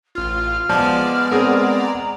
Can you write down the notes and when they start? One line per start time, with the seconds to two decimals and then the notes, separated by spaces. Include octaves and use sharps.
0.15 A1 F4 F6
0.69 F3 G#3 B3 D5
1.32 C4 G#4 A#4 A#5